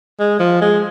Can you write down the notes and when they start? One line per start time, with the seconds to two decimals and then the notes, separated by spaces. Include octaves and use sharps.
0.19 G#3
0.40 F3
0.61 G#3